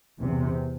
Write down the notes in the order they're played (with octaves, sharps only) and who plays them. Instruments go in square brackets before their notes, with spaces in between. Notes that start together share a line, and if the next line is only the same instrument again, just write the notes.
[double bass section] E2 C3